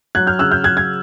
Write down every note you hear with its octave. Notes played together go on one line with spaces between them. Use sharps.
F#3 F#6 G#6
F6 G6
C#3 E6 F#6
F6 G6
F#3 F#6 G#6
G#6